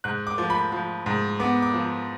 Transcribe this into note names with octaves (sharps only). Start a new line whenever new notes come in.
G#2 F#6
D6
F3
B5
F3
G#2
B3 D6
D6
F3